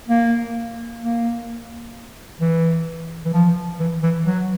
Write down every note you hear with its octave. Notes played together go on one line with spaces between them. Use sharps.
A#3
A#3
E3
E3
F3
E3
E3
F#3